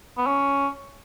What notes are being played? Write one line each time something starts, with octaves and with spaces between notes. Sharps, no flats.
B3
C#4